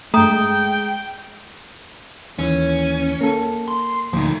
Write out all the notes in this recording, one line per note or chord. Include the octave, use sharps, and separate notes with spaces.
G2 G#3 A3 G5 A#5 D#6
D#2 E3 C#4
A#3 A4
C6
D2 A#2 F3 D#4